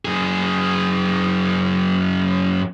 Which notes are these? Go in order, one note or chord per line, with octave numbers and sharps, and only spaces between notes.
F#2 G#4